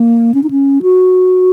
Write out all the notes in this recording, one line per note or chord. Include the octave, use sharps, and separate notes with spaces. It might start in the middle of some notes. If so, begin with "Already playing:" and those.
Already playing: A#3
C#4
D#4
C#4
F#4